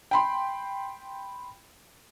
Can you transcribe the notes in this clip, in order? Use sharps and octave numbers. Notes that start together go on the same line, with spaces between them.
G5 B5 C6